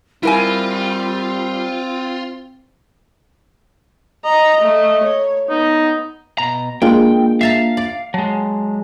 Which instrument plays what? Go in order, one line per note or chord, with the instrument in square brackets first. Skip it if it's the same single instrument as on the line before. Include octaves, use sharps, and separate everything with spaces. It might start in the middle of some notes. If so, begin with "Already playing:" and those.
[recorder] G3 [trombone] C4 [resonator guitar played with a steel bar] E4 A#4 G#5 [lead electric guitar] F4
[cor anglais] D#5 [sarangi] A#5
[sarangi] A3
C#5
[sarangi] B3 [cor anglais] D#4
[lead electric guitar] B2 A#5
[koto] G#3 [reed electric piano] A#3 D4 F4 [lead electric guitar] G5
[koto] E5 A5 A#5 [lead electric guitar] F5
[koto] D5
[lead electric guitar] F#3 G#3 [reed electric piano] A5